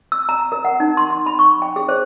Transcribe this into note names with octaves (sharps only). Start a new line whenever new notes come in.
E6
A#5
A#4
F#5
D#4
C6
C6
B5
C#6
G5
G#4
C5